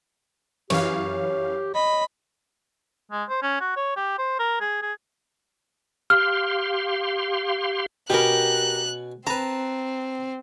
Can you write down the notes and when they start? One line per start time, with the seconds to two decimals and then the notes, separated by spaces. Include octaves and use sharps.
0.70 F#2 E3 G4 C#5 F5
1.75 D#5 B5
3.11 G#3
3.29 C5
3.43 C#4
3.61 F#4
3.76 C#5
3.96 G4
4.18 C5
4.39 A#4
4.61 G#4
4.82 G#4
6.10 G4 F5 C6 F6
8.10 B2 B3 C#4 G4 A#4 F#6
9.27 C4 B4 A5 A#5